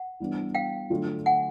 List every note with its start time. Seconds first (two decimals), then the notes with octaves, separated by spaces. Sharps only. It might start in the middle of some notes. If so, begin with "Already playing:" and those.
Already playing: F#5
0.20 E3 G3 B3 D4
0.55 F5 G5
0.90 D3 F#3 A3 D4 F4
1.26 F#5 G#5